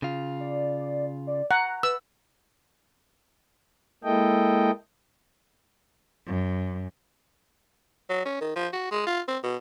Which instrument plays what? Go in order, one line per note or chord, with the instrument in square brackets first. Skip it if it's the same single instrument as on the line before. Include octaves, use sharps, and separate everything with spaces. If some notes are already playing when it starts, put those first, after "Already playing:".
[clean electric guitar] C#3 F4
[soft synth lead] D5
D5
[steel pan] F#5 [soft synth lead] A#5
[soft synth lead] B4 [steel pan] E6
[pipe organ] G#3 A#3 E4 A4 D#5 G5
[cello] F#2
[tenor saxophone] F#3
C#4
D#3
F3
F#4
G#3
F4
C4
B2